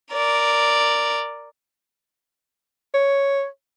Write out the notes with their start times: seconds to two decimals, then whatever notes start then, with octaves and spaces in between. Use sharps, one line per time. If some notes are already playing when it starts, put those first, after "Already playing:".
0.13 A#4 D5
2.94 C#5